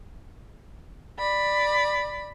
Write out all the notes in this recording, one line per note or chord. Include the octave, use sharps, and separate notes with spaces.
D5 B5